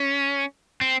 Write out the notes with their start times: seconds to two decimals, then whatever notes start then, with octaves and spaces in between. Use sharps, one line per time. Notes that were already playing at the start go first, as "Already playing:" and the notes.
Already playing: C#4
0.81 C4